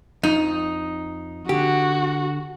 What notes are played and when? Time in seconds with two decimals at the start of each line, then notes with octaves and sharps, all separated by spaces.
0.23 F2 D#4
1.49 D3 F#4 G4